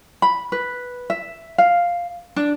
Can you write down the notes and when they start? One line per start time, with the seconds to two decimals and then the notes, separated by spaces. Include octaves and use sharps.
0.22 B5
0.52 B4
1.10 E5
1.58 F5
2.36 D4